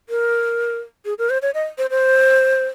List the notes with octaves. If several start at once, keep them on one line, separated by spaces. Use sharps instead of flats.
A#4
G#4
A#4
C5
C#5
D#5
C5
C5